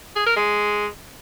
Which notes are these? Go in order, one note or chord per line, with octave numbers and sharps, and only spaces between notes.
G#4
A#4
G#3